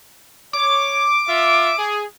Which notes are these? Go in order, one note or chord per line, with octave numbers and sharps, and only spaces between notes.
C#5 D6
F4 E5
G#4